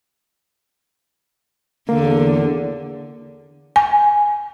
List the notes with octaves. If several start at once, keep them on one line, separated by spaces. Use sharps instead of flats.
E2 D3 A#3
G#5